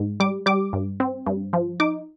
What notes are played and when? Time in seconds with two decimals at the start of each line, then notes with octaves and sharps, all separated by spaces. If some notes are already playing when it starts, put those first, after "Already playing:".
Already playing: G#2
0.20 G3 D6
0.46 G3 D6
0.73 G2
1.00 C4
1.27 G2
1.53 F3
1.80 D#4 D6